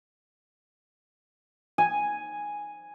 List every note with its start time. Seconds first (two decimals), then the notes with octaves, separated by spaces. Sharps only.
1.78 G#5